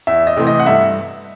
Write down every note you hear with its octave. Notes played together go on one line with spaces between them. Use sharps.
E2 E5
D#5
C3 E3 A3 C4
D#5
F#5
G2 E5